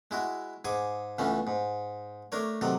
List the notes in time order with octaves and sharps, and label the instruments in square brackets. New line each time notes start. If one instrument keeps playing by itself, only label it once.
[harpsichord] G#3 E4 F#4
G#2 G#4 G#5 D6
C#2 E3 A3 B3 C#4
G#2
A3 D4 A#4 C#5
C3 D#3 F#3 A4